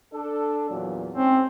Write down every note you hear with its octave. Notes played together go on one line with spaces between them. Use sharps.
D4 A4
E2 A#2 F#3
G#2 C4 C#4